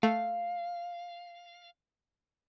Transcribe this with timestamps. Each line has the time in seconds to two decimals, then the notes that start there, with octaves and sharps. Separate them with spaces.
0.03 A3 F5